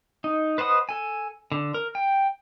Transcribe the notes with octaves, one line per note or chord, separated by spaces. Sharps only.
D#4
B4 C5 D#5 F#5 D#6
A4 G#5
D3
A#4
G5